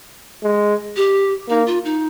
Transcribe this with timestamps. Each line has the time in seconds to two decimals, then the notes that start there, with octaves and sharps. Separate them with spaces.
0.43 G#3
0.96 G4
1.49 A#3 D#4
1.66 F4
1.85 D#4